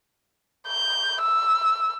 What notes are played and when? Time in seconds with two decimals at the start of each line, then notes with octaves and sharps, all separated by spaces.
0.68 G6
1.22 E6